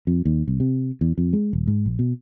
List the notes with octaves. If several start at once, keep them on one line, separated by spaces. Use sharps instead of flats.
F2
D#2
C2
C3
E2
F2
G#3
D#1
G#2
A#1
B2